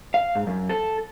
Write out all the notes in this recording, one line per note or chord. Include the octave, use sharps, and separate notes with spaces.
F5
G#2
F#2
A4